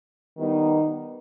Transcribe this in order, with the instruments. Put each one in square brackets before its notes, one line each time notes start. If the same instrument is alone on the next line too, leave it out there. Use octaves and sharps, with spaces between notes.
[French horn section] D#3 G3 B3 D#4